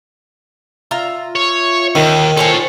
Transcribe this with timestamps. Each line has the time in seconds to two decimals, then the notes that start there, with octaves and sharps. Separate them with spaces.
0.91 F4 E5 A#5
1.36 C#5
1.95 D#2 D#3
2.37 F4 A4 C5 C#5 G#5